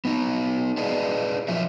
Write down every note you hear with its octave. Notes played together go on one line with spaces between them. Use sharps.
B3 D#4
G#4 B4 D5 D#5 A5
F3 F#3 E5